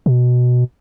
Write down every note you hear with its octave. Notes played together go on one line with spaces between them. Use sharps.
B2